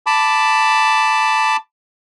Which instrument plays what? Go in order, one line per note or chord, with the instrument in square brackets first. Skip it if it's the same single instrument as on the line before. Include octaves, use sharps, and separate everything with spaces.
[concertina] A5 B5 D6